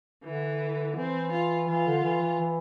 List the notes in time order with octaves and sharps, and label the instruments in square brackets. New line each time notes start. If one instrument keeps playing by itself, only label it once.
[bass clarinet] D3 [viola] E3
[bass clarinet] E3 [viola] C4
[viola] F4
[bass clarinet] E3 [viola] F4
[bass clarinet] D3
E3
E3
E3